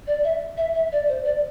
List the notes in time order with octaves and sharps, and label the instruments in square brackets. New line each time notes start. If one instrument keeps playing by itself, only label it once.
[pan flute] D5
E5
E5
E5
D5
C5
D5